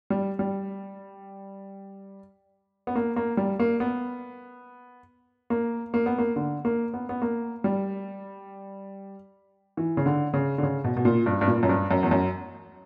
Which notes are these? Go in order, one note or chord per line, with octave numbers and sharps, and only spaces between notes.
G3
G3
B3
A#3
A#3
G3
A#3
B3
A#3
A#3
B3
A#3
D3
A#3
B3
B3
A#3
G3
E3
C#3
D3
C#3
D3
C#3
B2
B2
A#2
G2
G2
A#2
F#2
G2
F#2
E2
F#2